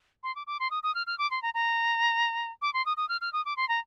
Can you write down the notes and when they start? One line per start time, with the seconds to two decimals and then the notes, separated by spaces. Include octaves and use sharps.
0.23 C6
0.35 D6
0.47 D6
0.60 C6
0.71 D#6
0.83 D#6
0.95 F6
1.07 F6
1.18 D6
1.31 C6
1.42 A#5
1.54 A#5
2.62 D6
2.74 C6
2.86 D#6
2.97 D#6
3.09 F6
3.21 F6
3.33 D#6
3.45 D6
3.57 C6
3.69 A#5